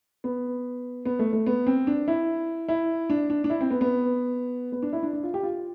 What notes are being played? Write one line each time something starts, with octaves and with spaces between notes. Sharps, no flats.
B3
B3
A3
A3
B3
C4
D4
E4
E4
D4
D4
D4
E4
C4
B3
B3
B3
D4
E4
D4
D4
F4
G4
F4